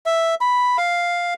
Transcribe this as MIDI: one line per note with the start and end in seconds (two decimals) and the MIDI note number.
0.06 0.35 76
0.41 0.77 83
0.78 1.34 77